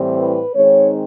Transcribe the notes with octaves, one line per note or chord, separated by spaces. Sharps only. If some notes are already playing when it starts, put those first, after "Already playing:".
Already playing: A2 E3 G3 C4
B4
D#3 G#3 C4 D#4 C#5